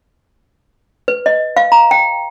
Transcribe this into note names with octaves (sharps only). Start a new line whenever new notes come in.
B4
D#5
F5
A#5
G5